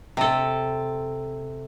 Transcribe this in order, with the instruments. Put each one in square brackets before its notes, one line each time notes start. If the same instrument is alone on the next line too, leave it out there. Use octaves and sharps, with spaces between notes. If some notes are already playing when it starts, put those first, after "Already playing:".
[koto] C3 A4